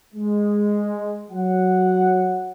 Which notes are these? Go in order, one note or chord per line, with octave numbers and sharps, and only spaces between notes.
G#3
F#3 F#5